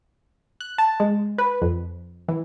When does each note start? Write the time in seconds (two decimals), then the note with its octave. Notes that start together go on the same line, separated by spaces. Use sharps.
0.61 F#6
0.78 A5
1.00 G#3
1.38 B4
1.62 F2
2.28 E3